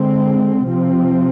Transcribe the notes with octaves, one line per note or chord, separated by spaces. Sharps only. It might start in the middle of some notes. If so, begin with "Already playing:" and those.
Already playing: D3 G#3 C4
C3 F3 C4